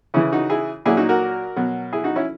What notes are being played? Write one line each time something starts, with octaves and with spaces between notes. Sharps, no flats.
C#3 E3 C#4 E4
D#4 F#4
E4 G#4
A#2 F#3 E4 G#4
D#4 F#4
F#4 A#4
B2 F#3
E4 G#4
D#4 F#4
C#4 E4